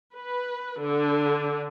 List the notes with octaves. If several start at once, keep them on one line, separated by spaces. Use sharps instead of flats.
B4
D3